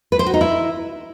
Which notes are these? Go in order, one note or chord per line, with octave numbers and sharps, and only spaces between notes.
B4
C5
F#4
D#4
E4